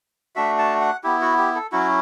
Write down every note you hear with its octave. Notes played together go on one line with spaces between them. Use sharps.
A3 D4 F#4 E5
A5
F#5
B3 E4 G4
F#4
G4
A4
F#3 C#4 E4 F#4